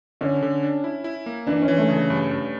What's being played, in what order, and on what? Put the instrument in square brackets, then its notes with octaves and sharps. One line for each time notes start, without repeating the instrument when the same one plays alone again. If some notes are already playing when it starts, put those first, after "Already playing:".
[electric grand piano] D3 [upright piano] C#4
[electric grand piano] D3
D4
E4
E4
A#3
[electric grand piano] E3 [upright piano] D4
[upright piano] C#4
[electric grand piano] E3
[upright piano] A3
[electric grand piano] C#3
[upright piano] A3
[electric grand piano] G2
G2